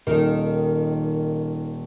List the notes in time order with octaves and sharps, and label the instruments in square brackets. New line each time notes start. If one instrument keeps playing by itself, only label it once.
[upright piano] D#1 [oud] D#3